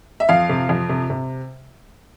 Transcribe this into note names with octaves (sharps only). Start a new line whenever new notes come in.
E5
F2 F5
C3
F2
C3
C3